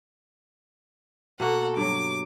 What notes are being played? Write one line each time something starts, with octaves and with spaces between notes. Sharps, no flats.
B2 A#3 F#4 A4 F#5
G2 F#3 D6